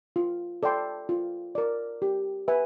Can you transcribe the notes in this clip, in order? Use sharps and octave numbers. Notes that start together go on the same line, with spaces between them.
F4
A4 D5 G5 C6
F4
A#4 D5
G4
B4 E5 G#5